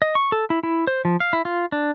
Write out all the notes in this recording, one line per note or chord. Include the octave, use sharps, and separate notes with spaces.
D#5
C#6
A4
E4
E4
C5
F3
F5
E4
F4
D4